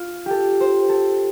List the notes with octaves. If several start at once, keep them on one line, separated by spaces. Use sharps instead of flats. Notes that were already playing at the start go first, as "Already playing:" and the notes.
Already playing: F4
G4 A4
C5
A4